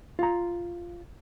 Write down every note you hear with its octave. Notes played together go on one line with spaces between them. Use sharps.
F4 A#5